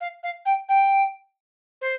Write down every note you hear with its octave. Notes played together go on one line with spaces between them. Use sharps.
F5
F5
G5
G5
C5